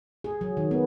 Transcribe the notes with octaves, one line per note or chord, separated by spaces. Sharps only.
G#4
F#3
D#3
B3